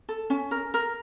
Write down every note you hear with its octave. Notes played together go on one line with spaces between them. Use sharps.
A4
C#4
A#4
A#4